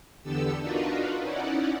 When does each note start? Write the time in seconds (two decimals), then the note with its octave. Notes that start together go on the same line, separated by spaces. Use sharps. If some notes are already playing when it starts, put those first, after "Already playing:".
0.23 E2 D3 B3 G4 A4 E6
0.61 D4 D#4 F4 F#4 A#4 B4
1.19 C#4 D#4 E4 D5 F#5